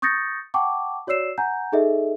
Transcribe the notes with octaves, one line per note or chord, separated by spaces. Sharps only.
C#6 D#6 G6 A6 A#6 C#7
F#5 G5 A5 C#6 D6
F#4 C#5 D5 E6 C7 E7
F#5 G#5 A#5 G6
D#4 G#4 A4 D#5 E5